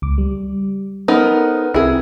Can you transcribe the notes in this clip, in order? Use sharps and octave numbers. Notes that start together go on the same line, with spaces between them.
C#2 D6
G3
B3 C#4 D#4 A4 A#4 C5
C2 C4 E4 G#4 A#4